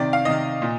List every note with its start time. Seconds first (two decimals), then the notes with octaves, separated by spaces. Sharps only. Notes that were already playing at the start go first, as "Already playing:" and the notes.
Already playing: C3 D#3 D5
0.13 F5
0.25 C3 D#3 D#5
0.62 A#2